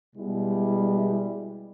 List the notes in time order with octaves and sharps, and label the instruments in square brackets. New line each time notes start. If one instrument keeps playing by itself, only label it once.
[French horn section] B2 G3 G#3 E4